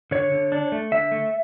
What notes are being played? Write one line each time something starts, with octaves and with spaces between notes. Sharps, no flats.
D3 C#5
D3
D4
A3
D3 E5
A3